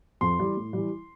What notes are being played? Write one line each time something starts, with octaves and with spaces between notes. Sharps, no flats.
F2 C6
E3 G3
A2
E3 G3